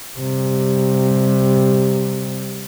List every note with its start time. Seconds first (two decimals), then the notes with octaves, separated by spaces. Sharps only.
0.19 C3 G3